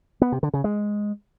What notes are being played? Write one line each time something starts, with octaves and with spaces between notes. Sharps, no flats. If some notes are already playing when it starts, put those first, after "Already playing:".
B3
C3
D3
C#3
G#3